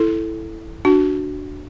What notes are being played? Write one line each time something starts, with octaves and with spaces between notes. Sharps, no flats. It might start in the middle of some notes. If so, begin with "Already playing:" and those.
Already playing: E4 A4
D4 F#4